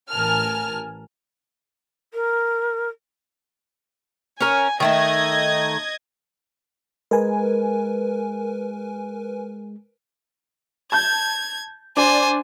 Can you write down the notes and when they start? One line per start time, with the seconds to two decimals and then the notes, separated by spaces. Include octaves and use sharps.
0.10 A1 A#4 G#5 A5 F6
2.13 A#4
4.40 C#4 A#4 G#5
4.80 D#3 A3 A4 D#5 G#6
7.11 G#3 A#4 B4 G#5
10.92 A5 G6 G#6
11.97 D4 C5 D5 G#5